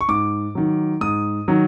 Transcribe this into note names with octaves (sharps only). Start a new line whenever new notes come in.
C#6
G#2 D6
D#3 F#3
G#2 D#6
D#3 F#3